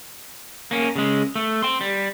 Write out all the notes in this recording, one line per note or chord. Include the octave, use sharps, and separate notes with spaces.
A#3 C#4
C#3 G#3
A3
G5 C6
G3